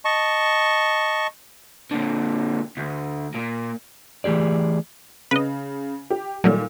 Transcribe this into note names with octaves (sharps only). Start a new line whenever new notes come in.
D#5 A5 C#6
A#2 D3
D2
A#2
E3 A3 G4 G#4 D5
C#3 B4 D#5
G4
A#2 D#3 F#3 G3 A3 A#3